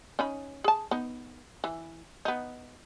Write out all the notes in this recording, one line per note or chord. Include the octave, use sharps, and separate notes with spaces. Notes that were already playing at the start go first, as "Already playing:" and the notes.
C#4 D#4 B5
G#4 A5
B3 D#4
E3
B3 D#4